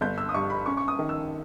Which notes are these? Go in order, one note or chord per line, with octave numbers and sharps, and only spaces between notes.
G1 G6
E6
D#6
G2 C#6
B5
C#4 C#6
C#6
D#6
D#3
E6